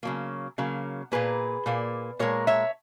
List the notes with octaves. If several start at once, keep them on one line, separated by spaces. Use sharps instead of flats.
C#3 F#3 A#3
C#3 F#3 A#3
A#2 A#3 G#4 B4
A#2 A#3
A#2 G#3 A#4 C#5
C#5 E5